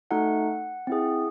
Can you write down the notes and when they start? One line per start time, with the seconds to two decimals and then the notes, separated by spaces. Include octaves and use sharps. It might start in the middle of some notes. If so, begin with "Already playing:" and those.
0.11 A3 D#4 F#4 A4 F#5
0.87 C4 E4 G#4